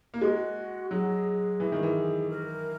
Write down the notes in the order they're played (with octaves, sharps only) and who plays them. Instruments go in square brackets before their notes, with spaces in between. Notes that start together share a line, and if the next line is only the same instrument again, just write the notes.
[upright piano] A#3
[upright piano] G#3 [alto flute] F#4
[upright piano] F#3 [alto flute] G#4
[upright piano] E3
D#3
E3
[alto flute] A#4